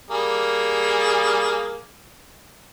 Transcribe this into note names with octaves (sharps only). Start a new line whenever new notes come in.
G3 A#3 G#4